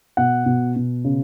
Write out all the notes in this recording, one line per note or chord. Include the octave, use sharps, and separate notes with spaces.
B2 F#5
B2
B2
C#3